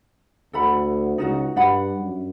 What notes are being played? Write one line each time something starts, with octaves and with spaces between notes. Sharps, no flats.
D2 A4 F#5 B5
C#2 D#4 F4 F#4
G2 D4 F#5 B5
F#2